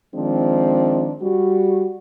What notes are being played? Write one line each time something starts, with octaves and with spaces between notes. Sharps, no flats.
D#3 F3 G#3 C4 D4
G3 F#4